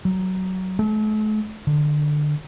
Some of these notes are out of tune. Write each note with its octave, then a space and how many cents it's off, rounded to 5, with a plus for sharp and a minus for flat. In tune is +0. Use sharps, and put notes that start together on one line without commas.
F#3 +15
A3 -45
D3 +20